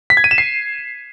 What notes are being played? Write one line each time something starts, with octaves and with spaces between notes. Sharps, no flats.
B6
G#6
D#7
E7
C7